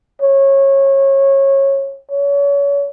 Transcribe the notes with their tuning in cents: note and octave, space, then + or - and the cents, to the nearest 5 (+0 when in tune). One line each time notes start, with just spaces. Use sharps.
C#5 -20
C#5 +35